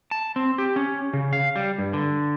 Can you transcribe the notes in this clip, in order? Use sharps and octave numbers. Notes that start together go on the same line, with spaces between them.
A5
C4
G4
C#4
C#3
F5
G3
G2
D3